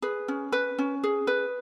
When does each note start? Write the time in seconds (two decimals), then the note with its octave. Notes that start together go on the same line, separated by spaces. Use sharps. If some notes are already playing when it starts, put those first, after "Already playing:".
0.02 G#4 B4
0.28 C#4
0.52 B4
0.79 C#4
1.04 G#4
1.27 B4